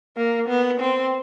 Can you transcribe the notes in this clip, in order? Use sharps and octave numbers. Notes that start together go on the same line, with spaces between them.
A#3
B3
C4